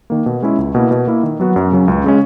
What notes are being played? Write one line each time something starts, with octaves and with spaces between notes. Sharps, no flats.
D#3 A#3
B2
G#3 C#4 E4
C#2
B2 A#3 E4
B2
A#3 E4
D#3
F#3 B3 F#4
F#2
C#3 F#3 C#4
C#2
C#3 G#3 C#4